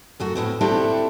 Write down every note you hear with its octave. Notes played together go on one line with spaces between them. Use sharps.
F#2 A3 F#4
A2 B3 C4
C4 D4 E4 F#4 G4 A4